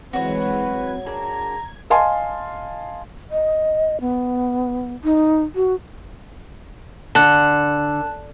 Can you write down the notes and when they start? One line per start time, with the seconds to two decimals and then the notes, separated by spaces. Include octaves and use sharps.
0.13 E3 F#3 G#3 C4 F#4 B4 C#5
0.64 G#6
1.06 D4 G#4 A#4 A#5
1.90 D#5 F5 G#5 A5 C6
3.31 D#5
4.01 B3
5.04 D#4
5.55 F#4
7.15 D3 A5 F#6